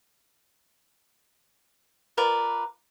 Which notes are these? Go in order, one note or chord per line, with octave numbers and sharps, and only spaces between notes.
F4 A#4 B4 D5